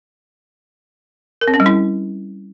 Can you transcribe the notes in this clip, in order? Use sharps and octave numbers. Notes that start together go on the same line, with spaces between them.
A#4
C4
C#4
G3
E4